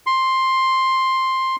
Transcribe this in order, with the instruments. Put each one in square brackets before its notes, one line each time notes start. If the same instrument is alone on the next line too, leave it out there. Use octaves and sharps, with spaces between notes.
[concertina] C6